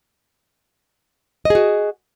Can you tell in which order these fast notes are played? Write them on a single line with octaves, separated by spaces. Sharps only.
D#5 G#4 F#4